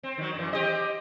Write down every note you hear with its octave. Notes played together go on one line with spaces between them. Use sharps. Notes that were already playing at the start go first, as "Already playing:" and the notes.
C4
D#3 F#3
F#2 E3
C4 G4 D#5